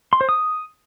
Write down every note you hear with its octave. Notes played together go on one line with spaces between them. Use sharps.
C6
C5
D#6